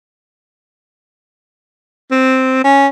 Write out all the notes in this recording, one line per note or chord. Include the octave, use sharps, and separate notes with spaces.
C4
C#4